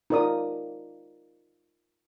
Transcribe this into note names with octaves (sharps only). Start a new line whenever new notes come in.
D#4 F4 A#4 D5 D#6